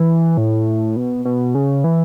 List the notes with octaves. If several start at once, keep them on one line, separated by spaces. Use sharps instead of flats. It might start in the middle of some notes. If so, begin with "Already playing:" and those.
Already playing: E3
A2
B2
B2
C#3
E3